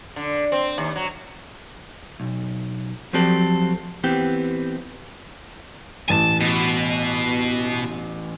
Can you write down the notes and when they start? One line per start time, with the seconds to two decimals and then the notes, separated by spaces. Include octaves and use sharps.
0.16 D3
0.52 C4
0.78 D#2
0.96 F#3
2.20 B1
3.13 F3 F#3 C4 G4 A4 D5
4.03 E3 B3 C4 G4
6.09 A1 G#5 A5
6.41 B2